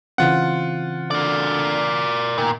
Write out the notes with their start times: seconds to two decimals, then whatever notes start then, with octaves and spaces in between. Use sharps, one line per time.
0.18 C#3 E3 C4 F4 F#5
1.11 D3 A#4 D5
2.38 A#2 D#3